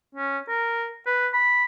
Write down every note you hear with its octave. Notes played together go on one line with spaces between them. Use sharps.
C#4
A#4
B4
B5